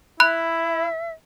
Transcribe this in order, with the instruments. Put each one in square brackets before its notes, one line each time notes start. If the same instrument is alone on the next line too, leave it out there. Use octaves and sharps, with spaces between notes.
[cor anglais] E4 [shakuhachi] E5 [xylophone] B5 F#6